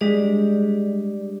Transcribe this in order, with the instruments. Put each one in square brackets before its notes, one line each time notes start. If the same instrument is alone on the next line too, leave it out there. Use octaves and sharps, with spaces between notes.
[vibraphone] G3 D4 G4 D5 [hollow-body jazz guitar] G#3